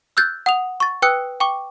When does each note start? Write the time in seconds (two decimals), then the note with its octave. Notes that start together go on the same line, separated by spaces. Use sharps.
0.17 E6 F#6 G6 A6
0.46 F#5 D#6 F7
0.80 C#6 A6
1.02 B4 G5 D#6 E6 F#6 C#7
1.40 G5 C#6 D6